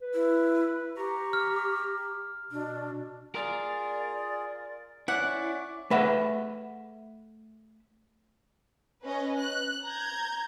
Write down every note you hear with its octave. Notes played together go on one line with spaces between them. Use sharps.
B4
E4
G4 A#5 C#6
F6
B2 D4
F4 G#4 A#4 D5 F5
C#4 E4 D5 F#5
A3 B4 E5 F#5
C#4 B4 D#5
F#6
A#5 G6 G#6